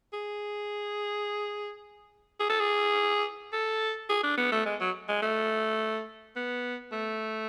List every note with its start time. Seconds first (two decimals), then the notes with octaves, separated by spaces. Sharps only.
0.13 G#4
2.39 G#4
2.50 A4
2.60 G#4
3.53 A4
4.09 G#4
4.23 D4
4.38 B3
4.52 A3
4.66 G#3
4.80 F#3
5.09 G#3
5.22 A3
6.36 B3
6.92 A3